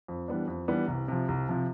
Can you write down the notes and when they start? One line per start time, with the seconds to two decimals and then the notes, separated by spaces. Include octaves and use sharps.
0.08 F2
0.28 E3 G3 B3 D4
0.47 F2
0.68 E3 G3 B3 D4
0.88 C2
1.08 C3 F3
1.28 C2
1.49 C3 F3